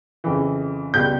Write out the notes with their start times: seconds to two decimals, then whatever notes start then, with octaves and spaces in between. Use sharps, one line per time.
0.24 F2 C#3 E3
0.94 C#2 B2 G3 B3 G6